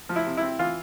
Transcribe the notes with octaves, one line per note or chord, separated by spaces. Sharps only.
F3
E4
C3
E4
C4
E3 F4